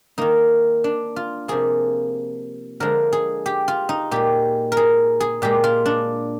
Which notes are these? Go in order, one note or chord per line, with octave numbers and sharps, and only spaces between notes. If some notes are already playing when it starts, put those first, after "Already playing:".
D#3 A#3 D#4
D4
F4
C3 F3 A#3 G#4
D3 F3 G#3 A#4
G#4
G4
F4
D#4
A#2 G#3 G4
A#4
G#4
G#4
A#2 G#3 G4
F4
D4